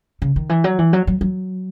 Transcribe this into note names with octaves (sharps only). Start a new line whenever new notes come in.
C#3
D#3
E3
F#3
E3
F#3
F#3
F#3